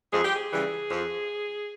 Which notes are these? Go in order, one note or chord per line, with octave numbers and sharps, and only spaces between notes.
F2 G#4
G4
G#4
C#3 E3 G3
F2